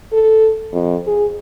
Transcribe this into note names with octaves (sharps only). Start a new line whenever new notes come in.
A4
F2
G#4